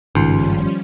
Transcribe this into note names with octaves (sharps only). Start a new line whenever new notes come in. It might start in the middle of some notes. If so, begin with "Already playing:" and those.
G#1 C#2 G2 D#3 F3 G3 C#4 C6